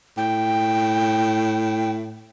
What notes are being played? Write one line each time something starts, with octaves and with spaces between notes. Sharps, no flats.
A2 G5